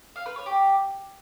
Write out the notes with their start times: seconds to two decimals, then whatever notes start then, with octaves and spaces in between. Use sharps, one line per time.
0.16 F5
0.26 B4
0.36 C#5
0.46 G4